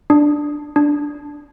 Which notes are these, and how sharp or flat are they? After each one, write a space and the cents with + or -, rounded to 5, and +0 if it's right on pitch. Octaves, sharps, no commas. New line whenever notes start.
D4 +5
D4 -5